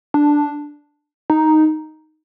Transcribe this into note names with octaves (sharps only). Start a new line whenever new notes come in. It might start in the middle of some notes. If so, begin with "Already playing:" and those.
D4
D#4